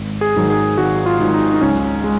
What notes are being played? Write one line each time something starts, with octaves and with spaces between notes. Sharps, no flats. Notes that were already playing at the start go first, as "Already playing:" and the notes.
Already playing: G#1
G#4
G#2 D#3 F#3
G#4
G#1 F#4
F4
G#2 D#3 F#3
D#4
D#4
C#2 C#4
G#3